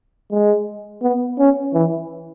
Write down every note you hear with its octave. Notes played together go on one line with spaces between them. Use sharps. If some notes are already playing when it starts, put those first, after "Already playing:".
G#3
B3
C#4
E3